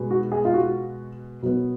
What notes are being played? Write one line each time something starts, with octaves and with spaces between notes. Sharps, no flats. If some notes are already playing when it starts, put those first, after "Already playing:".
Already playing: B2 G#3 B3
F#4
G#4
F4
F#4
B2 F#3 B3